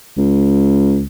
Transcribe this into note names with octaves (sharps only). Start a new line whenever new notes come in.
C#2